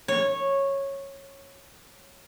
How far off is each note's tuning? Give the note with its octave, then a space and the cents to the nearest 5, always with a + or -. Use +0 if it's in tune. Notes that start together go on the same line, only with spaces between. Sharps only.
C#5 -10